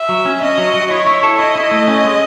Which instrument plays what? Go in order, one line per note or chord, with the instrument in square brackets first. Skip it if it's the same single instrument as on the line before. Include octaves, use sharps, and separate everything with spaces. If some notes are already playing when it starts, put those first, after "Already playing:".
Already playing: [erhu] E5
[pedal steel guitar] F#3
C#4
[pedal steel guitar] C#4 [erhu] D#5
[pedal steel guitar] F#3
F#3
[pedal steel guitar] E4 [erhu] C#5
[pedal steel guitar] E4
A4
[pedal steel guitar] E4 [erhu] D#5
[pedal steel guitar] E4
A3
C#4
G#3